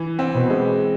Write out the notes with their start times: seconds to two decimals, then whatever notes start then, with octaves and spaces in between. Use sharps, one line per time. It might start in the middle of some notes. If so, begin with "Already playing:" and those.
Already playing: E3
0.19 C4
0.34 B2
0.50 G#3